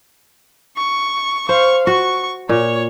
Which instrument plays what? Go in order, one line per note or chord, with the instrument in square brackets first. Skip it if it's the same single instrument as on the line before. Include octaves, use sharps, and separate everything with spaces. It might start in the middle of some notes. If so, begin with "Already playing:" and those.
[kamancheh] C#6
[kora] C5 [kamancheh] F5 C#6
[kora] F#4 [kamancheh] C#6
[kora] A#2 [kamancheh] C#5